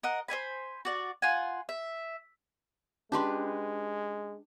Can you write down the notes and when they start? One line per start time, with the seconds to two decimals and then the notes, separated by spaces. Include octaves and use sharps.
0.03 A#4 D#5 F#5
0.28 C5 C#5 G#5 B5
0.85 F#4 D5
1.22 F4 F#5 G#5
1.69 E5
3.12 G#3 C#4 D4 F4 G4 B4 C6